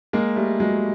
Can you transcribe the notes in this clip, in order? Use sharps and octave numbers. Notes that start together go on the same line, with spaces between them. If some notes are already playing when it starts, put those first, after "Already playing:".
G#3 A#3
G3 A3
F#3 G#3